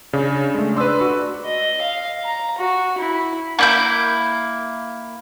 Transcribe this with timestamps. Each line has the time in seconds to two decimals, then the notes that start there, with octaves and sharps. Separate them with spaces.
0.13 C#3 D4
0.54 G#3 A3
0.76 D4 B4 C6 E6
1.01 F#4
1.45 D#5
1.82 F5
2.24 A#5
2.58 F#4
2.98 E4
3.59 A#3 E4 G6